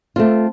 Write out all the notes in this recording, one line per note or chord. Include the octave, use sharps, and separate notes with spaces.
A3 C4 F4